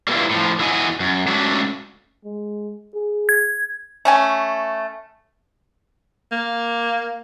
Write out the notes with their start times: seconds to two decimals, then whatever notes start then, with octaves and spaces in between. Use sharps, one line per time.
0.08 G3 A#3 B3 C#4 E4 F4
0.30 A2 F3
0.59 E2 E4 F#4 D#5 G#5
1.00 F#2
1.27 G#3 A3 C#4 D4 F#4 A4
2.25 G#3
2.95 G#4
3.29 G#6
4.05 A3 C#4 G#5
6.32 A#3